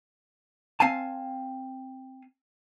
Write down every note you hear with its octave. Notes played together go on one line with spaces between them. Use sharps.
C4 F5 G#5 A5